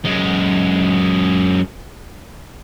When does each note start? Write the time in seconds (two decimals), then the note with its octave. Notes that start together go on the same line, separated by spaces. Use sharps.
0.05 F#2 G#3